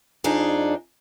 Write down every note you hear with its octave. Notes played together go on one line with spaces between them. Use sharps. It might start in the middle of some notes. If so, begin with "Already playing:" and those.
F2 D4 D#4 G#4